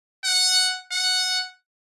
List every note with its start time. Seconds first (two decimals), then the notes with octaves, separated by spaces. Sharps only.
0.25 F#5
0.92 F#5